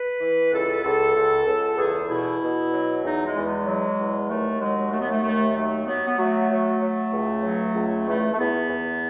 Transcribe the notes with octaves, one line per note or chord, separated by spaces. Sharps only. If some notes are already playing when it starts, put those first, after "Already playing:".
Already playing: B4
E3
C#2 A4
C#2 A4
C#2
C#2
E2 G#4
B2 E4
B2
F#3
E2 D#4
G#3
E2
G#3
F#3
E2
D#2 A3
F#3 G#3
D#2 A3
B3
A3
D#2 A3
F#3 A3
F#3 B3
B3
F#3 A3
F#3
F#3
C#2
F#3
C#2
E2 A3
A3
E2 B3
E2